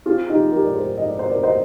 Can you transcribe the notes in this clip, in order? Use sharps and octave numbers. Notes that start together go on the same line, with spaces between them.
C4 F4 G#4
D#4 G4
F3
G4 A#4
G#2 D5
G#4 C5
G#2 D#5
D5
C5
C4 A#4 D5
C5 D#5